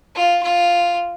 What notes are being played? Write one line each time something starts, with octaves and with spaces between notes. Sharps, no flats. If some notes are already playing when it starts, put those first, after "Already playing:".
F4
F4